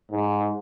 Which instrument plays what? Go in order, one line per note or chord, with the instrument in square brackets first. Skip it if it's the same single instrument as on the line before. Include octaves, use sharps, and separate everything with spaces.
[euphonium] G#2